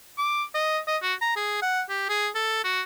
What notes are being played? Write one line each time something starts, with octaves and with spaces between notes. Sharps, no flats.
D6
D#5
D#5
F#4
A#5
G#4
F#5
G4
G#4
A4
F#4